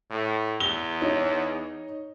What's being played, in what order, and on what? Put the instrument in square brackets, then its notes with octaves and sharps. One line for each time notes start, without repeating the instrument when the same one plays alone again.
[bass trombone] A2
[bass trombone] E2 [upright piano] G7
[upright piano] D#4 C#5 D#5